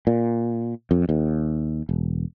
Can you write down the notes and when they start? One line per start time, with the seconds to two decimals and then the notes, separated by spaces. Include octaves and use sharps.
0.07 A#2
0.91 F2
1.09 D#2
1.89 E1